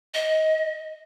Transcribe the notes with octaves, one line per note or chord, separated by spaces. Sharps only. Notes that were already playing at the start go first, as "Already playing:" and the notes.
D#5